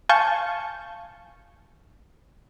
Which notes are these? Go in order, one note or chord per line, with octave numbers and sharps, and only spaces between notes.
F5 G#5 A5 C#6 G6